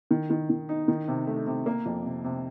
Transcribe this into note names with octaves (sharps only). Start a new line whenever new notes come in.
D#3
D#3
D#3
D#4
D#3
C3
A3
C3
A#3
F2
C3
C3